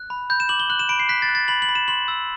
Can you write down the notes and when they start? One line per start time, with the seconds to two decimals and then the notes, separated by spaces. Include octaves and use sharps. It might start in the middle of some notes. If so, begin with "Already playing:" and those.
Already playing: F#6
0.10 B5
0.30 B5 G6
0.40 E7
0.49 D6 F#7
0.60 G7
0.70 F#6 F#7
0.79 E7
0.89 B5 D7
0.99 C7
1.09 F#6 B6
1.22 A6
1.29 F#6
1.35 A6
1.48 B5 F#7
1.62 F#7
1.69 B5
1.75 E7
1.88 C6 F#7
2.08 E6